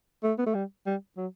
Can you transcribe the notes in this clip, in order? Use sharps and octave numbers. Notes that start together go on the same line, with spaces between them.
A3
B3
A3
G3
G3
F#3